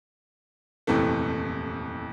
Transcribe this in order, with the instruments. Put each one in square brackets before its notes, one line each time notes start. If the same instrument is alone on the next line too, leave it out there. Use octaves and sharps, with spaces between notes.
[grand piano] D#1 F2 C3 E3 A3